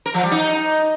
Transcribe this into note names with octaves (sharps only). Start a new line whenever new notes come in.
A#4
F3
G3
D#4